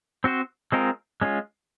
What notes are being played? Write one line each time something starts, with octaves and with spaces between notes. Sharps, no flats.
C4 F#4 C5
G#3 C4 F4 A#4 D#5
G#3 C#4 F4